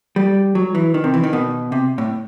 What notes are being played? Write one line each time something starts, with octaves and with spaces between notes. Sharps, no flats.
G3
F#3
E3
D#3
C3
E3
D#3
B2
C3
A2